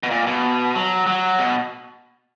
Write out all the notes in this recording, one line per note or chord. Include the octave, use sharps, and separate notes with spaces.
B2
A#2
B2
F#3
F#3
B2